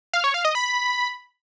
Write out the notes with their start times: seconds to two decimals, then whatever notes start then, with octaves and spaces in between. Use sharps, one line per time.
0.13 F5
0.24 C#5
0.34 F5
0.45 D#5
0.55 B5